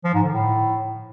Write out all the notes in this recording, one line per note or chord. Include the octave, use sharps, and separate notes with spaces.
F3
G#2
D3
A2